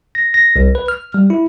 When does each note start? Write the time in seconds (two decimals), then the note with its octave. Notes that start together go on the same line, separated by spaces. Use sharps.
0.15 A#6
0.34 A#6
0.56 C2
0.75 B4
0.88 F6
1.14 G3
1.30 E4